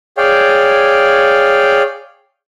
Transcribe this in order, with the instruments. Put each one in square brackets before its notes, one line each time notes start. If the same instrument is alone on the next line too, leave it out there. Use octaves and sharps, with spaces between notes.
[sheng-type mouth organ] G#4 C#5 D5 F5 G5